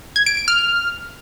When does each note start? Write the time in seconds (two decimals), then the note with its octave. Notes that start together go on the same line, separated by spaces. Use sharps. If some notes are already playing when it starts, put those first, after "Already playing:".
0.16 G#6
0.26 D7
0.37 D7
0.48 F6